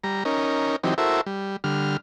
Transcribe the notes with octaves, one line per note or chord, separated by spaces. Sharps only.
G3 A#5
C#4 D#4 A#4
E3 F#3 C4 D#4 G4
E4 F#4 A4 A#4 C5 E5
G3
D3 G3 F6